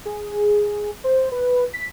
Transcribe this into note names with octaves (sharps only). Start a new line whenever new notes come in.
G#4
C5
B4
B6